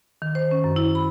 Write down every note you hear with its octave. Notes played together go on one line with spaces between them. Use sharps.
D#3
C5
C#4
F#2
E4
B5